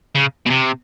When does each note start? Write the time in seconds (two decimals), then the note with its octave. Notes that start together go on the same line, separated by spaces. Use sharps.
0.15 C#3
0.46 B2
0.50 C3